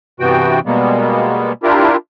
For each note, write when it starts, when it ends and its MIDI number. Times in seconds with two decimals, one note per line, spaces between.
0.20 0.59 43
0.20 0.59 48
0.20 0.59 52
0.20 0.59 59
0.20 0.59 66
0.20 0.59 79
0.66 1.52 47
0.66 1.52 55
0.66 1.52 56
0.66 1.52 58
0.66 1.52 59
1.63 1.96 62
1.63 1.96 64
1.63 1.96 65
1.63 1.96 67
1.63 1.96 70